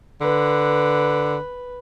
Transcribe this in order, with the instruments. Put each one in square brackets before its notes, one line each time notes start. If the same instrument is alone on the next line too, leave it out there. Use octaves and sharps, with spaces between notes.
[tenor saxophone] D3 [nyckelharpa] B4